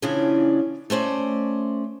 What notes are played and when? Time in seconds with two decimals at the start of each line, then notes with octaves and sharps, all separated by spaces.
0.02 C#3 E3 F3 C#4 D4
0.90 A3 C#4 C5 D5